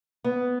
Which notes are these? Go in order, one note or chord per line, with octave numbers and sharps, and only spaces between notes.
B3